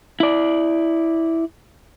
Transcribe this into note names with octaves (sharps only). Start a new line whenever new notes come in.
E4 D5